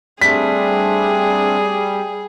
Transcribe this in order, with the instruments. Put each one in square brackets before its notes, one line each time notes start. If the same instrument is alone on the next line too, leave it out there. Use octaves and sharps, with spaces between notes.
[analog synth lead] G3 [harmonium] A3 C4 D4 [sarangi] G#4 [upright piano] B6